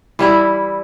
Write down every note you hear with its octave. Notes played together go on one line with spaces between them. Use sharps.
E3 G3 E4